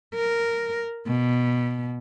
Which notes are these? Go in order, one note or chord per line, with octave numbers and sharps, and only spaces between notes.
A#4
B2